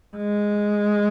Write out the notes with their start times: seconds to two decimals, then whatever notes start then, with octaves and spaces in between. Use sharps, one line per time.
0.16 G#3